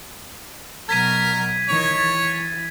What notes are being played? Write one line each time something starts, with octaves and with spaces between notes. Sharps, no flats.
B2 F#3 A#4 G#6 B6 D#7
D#3 E3 C#5
E3 A6